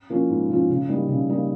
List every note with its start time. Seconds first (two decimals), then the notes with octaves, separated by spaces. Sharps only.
0.10 F3 A#3 C#4 F4
0.30 G#2
0.49 F3 A#3 C#4 F4
0.69 C#3
0.89 G3 A#3 D#4
1.09 C#3
1.29 G3 A#3 D#4